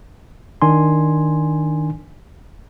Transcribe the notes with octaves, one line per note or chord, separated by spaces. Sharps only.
D#3 D4 G#5 C6